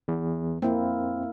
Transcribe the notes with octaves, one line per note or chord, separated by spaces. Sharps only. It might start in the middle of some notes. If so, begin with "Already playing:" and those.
E2
F2 A#3 C4 E4